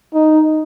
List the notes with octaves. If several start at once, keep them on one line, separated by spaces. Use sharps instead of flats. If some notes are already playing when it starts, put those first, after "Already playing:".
D#4